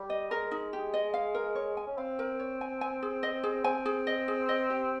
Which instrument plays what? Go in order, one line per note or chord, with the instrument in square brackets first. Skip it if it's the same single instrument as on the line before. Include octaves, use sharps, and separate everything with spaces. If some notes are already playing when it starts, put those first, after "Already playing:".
Already playing: [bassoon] G3
[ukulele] D#5
[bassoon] G#3 [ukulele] A#4
[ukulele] D#4
G4
D#5
F5
A#4
C#5
G#5
[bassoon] C#4
[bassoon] C4 [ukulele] F5
[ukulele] A#4
C#5
G#5
G#5
G#4
D#5
G#4
[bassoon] C4 [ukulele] G#5
[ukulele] G#4
D#5
G#4
D#5
G4